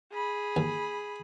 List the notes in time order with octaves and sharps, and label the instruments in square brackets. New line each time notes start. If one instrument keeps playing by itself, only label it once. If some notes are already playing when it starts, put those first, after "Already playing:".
[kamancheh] G#4 B5
[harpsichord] D#2